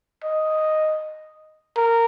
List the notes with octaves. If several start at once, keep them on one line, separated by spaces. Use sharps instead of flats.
D#5
A#4